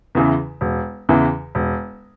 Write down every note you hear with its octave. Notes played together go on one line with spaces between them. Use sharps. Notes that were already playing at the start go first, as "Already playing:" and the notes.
E2 C#3 E3
E1
E2 C#3 E3
E1